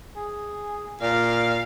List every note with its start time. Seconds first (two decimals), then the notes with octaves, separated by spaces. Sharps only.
0.16 G#4
1.01 A#2 D5 F5